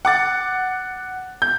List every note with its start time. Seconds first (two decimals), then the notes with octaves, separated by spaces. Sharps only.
0.05 F#5 D6 A6
1.42 G6